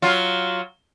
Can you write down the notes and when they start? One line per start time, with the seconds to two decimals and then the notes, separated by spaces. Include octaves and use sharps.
0.02 F#3 F4